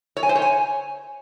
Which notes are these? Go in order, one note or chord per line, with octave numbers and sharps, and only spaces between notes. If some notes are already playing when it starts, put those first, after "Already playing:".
C#5
G#5
C5
C#5
G#5